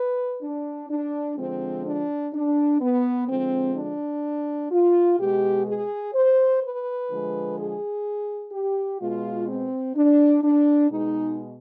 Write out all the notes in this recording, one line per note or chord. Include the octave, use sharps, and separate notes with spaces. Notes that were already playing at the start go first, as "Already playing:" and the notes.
Already playing: B4
D4
D4
D3 F3 G#3 C4
D4
D4
B3
D3 F3 G#3 C4
D4
F4
B2 G#3 G4
G#4
C5
B4
D3 F3 G#3
G#4
G4
B2 G#3 F4
C4
D4
D4
B2 G#3 D#4